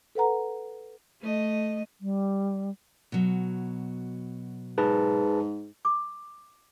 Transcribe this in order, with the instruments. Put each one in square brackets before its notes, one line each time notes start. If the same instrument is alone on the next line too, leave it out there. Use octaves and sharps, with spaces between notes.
[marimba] A4 B4 F#5 A#5
[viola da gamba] A3 D#5
[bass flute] G3
[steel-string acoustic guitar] B2 F#3
[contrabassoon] G#2 [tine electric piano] G#4 B4 A5
[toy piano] D6